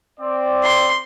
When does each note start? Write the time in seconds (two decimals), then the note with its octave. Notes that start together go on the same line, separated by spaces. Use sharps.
0.20 C4 D5
0.64 C6